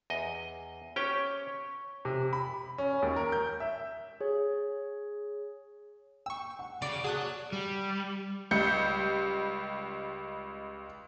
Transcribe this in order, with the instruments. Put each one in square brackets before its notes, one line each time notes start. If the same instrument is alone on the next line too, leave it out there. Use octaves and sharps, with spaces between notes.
[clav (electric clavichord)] E2 D#5
[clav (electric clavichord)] C#4 G4 G5 [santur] C#5
[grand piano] C3
B5
C#4
D#2
A#4
G6
E5
[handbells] G#4 C#5
[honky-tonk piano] G5 [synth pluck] C#6 E6
[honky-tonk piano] F#5
[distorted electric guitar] C#3 [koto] D5
[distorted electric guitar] F#3 [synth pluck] G#4 D#6 F#6 [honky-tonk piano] F#5 A5 C#6
[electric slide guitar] G3
[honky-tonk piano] C#2 G3 G6 C#7